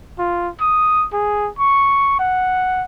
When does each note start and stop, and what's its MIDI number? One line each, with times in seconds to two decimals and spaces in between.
0.19 0.49 65
0.61 1.06 87
1.13 1.49 68
1.59 2.18 85
2.19 2.85 78